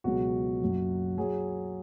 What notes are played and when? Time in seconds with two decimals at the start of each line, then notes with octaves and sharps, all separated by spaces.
0.04 C#2 B2 F#3 F#4
0.62 F#1 F#2 F#3
1.18 F#3 G#4